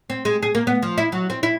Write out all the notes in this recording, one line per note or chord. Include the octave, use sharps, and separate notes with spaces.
C4
G#3
G#4
A#3
B3
F3
E4
F#3
C4
E4